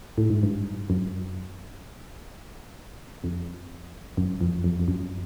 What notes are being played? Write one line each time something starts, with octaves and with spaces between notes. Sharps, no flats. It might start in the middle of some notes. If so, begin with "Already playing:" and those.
A2
G#2
G2
F#2
F2
F#2
F2
F2
F2
F#2